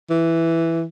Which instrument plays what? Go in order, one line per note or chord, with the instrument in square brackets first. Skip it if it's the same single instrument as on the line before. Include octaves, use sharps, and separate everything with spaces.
[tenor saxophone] E3